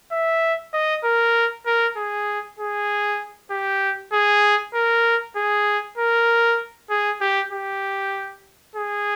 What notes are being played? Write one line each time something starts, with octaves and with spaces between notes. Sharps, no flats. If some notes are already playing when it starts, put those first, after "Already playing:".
E5
D#5
A#4
A#4
G#4
G#4
G4
G#4
A#4
G#4
A#4
G#4
G4
G4
G#4